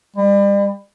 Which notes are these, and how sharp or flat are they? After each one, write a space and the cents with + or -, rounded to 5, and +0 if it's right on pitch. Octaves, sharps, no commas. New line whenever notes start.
G3 +40